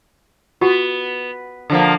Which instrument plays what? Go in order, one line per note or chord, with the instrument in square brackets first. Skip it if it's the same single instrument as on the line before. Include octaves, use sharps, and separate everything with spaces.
[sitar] B3 [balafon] F4 F#4
[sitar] D3 F3 A#3